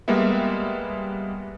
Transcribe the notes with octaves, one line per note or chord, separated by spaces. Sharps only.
G3 G#3 A#3 B3 E5